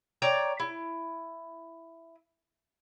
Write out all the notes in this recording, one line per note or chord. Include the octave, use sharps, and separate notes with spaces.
C#5 D5 G5 A#5
E4